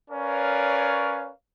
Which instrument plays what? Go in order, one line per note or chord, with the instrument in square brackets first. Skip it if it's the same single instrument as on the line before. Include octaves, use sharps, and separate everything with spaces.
[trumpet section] C#4 A#4 B4 C#5 D5 F5